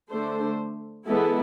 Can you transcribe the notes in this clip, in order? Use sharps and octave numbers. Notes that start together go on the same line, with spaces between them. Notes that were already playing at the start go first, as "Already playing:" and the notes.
D3 A3 D4 A4 C5
E3 G#3 B3 E4 A4